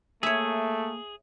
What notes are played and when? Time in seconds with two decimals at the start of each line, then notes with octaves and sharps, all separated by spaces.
0.23 A3 A#3 G#4 C#5 E5